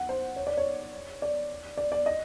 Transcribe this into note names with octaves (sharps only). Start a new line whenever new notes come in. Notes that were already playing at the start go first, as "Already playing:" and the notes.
Already playing: F#5
C5
C#5
D5
C#5
D5
D5
D5
D#5